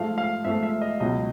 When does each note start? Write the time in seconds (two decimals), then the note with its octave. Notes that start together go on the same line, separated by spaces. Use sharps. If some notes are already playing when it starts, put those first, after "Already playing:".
Already playing: G#2 F3 A3 F5
0.18 F5
0.45 G#2 F3 A3 E5
0.63 E5
0.81 D#5
1.00 C#2 B2 F#3 D#5